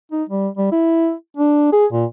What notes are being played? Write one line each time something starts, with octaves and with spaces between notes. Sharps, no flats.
D#4
G3
G3
E4
D4
G#4
A#2